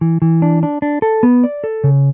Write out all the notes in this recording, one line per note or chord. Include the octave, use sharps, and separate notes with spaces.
E3
E3
D4
D4
D4
A4
B3
D5
A4
C#3